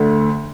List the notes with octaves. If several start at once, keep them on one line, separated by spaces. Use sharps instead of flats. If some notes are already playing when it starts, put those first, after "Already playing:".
Already playing: D2 D3 A3